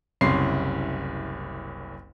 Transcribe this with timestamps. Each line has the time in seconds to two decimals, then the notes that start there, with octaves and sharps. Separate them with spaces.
0.21 F#1 C2 C#4 C6 C7